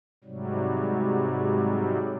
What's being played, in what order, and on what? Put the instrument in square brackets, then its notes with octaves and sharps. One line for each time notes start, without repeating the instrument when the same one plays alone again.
[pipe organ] G#2 C3 F#3 G3